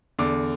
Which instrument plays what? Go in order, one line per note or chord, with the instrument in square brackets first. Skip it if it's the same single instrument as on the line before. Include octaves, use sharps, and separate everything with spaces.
[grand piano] E2 D3 D6